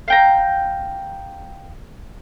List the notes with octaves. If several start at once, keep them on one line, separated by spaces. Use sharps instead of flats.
F5 G5 A#5